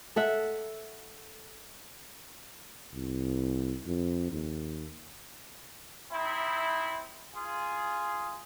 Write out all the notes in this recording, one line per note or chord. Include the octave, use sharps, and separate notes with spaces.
A4 E5 F#5
C2
F2
D#2
C4 D#4 E4
F4 G#4